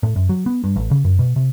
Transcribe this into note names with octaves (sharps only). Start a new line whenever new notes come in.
A2
F#2
F#3
B3
G2
A1
C#3
F#2
B2
C3